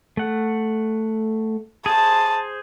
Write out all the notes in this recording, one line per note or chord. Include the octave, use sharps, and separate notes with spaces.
A3 F#5
G#4 C5 A5